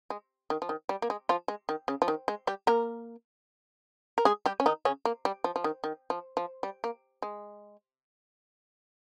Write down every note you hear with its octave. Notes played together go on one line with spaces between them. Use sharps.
G#3
D#3
F3
D#3
G3
A#3
G#3
F3 F4
G#3
D#3
C#3
F3
D#3
G#3
G3 G4
A#3 A#4
A#4
G#3 G#4
G3 G4
C#4
D#3 D#4
C#3 C#4
A#3
G3
F3
F3
D#3
D#3
F3
F3
G3
A#3
G#3